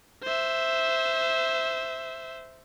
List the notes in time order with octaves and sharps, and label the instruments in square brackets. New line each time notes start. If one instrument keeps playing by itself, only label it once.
[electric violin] C5 E5